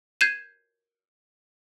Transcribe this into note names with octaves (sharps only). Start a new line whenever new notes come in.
G6 G#6 C7 D#7 E7